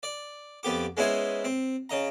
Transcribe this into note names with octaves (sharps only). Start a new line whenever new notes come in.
D5
F2 B3 G4 D6
G#3 B3 C#4 E4 C5 G#5
C4
C#3 D#5 A#5